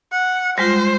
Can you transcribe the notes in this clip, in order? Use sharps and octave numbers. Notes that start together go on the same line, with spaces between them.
F#5
G3 G#3 F4 C5